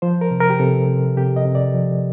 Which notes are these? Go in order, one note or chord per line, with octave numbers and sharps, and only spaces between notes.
F3 C5
A#4
C3
A#4
G4
C3 A4
C3
C3 G4
D#5
C3
D5
F3